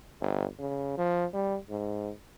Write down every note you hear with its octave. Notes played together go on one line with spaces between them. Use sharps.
G1
C#3
F3
G3
G#2